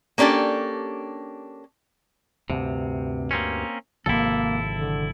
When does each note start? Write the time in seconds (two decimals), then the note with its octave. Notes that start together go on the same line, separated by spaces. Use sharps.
0.18 A#3 C#4 D4 G4 A4
2.50 D2 G2 C3
3.31 A#3 C4 C#4
4.06 G#1 C3 F3 A#3 E4 A4
4.72 D3